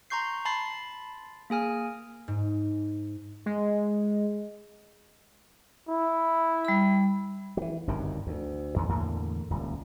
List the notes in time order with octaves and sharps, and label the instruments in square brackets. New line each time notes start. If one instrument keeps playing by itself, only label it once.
[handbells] A#5 C6 C#6 G6 C7
A5 B5 C6 A6 C7
A#3 G#4 G#5 F6
[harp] G#2
[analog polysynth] G#3
[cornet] E4
[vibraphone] G3 B5
[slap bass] E3 F#3
G1 C2 F#2 D#3
D2
E2 D#3
E2 A2 D3 A#3
D#1 C#2